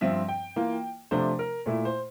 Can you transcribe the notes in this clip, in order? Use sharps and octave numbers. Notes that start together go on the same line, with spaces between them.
G2 F3 C4 E5
G5
E3 A#3 F4
C3 F3 A3 D4 C5
A#4
A#2 A3 E4
C5